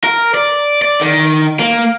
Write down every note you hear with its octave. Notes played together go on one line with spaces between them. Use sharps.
A#4
D5
D5
D#3
A#3